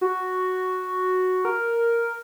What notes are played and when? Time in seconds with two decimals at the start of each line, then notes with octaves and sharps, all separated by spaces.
0.01 F#4
1.45 A#4